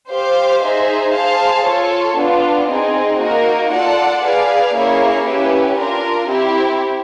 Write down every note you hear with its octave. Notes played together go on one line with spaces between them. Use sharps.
G4 C5 F5
D#4 G#4 C5 E5
G#4 C5 F5 A5
F4 A4 C#5
B3 D4 F4
C4 D#4 G#4
A#3 D#4 F#4 A#4
F4 A4 D5 F#5 A5
G#4 B4 D5 F5
A#3 C#4 E4 G#4 C#5
C#4 E4 G4 B4
D4 F4 A#4
C4 E4 G4